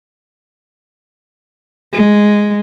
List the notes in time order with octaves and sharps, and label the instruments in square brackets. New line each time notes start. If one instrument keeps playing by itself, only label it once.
[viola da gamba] G#3